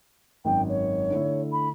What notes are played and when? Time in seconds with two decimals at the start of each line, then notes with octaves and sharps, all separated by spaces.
0.45 G#1 F#2 G5
0.68 C#5
1.11 D3 A3 E4
1.52 B5